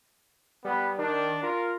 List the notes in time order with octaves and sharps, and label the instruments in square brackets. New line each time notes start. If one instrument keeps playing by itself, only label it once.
[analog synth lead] G3 [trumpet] B3
[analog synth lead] D#3 [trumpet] D4
[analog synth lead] F4 [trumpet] A#4